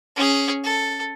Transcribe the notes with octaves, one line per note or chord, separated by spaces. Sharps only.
C#4 G#4
A4